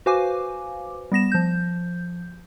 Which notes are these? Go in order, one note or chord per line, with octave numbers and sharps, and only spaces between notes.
F#4 B4 C5 F5 G#5 D6
G3 B3 A#6 E7
F3 G6